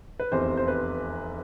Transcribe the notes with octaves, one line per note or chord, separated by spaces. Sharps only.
B4
F1 E2 C3 C5
C5
B4